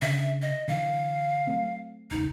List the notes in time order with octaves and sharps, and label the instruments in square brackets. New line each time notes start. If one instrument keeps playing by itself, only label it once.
[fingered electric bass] C#3 D4 [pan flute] E5
[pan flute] D#5
[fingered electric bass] D3 E3 [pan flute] F5
[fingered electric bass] F#3 A3 C4
[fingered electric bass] E1 C#2 [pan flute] D#4